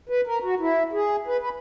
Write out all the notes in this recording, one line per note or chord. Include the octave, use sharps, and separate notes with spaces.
B4
A#4
F#4
E4
G#4
B4
B4